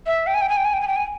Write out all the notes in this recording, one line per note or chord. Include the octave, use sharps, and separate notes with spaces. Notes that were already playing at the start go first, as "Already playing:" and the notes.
E5
G5
G#5
G5
G#5
G5
G#5
G5
G#5
G5
G#5